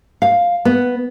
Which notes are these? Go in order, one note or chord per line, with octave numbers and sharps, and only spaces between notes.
F5
B3